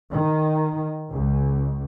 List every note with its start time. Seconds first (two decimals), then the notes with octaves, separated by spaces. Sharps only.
0.12 D#3
1.13 C#2